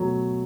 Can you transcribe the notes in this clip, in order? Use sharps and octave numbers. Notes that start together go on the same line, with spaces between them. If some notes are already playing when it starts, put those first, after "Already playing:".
Already playing: B2 F#3 A3